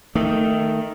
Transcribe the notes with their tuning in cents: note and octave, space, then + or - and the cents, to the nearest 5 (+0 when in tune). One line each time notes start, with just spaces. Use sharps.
D#3 +0 A3 +20